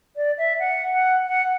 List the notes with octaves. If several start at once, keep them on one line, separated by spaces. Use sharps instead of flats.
D5
E5
F#5
F#5
F#5